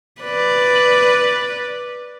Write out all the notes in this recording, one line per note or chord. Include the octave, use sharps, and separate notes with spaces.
B4 D5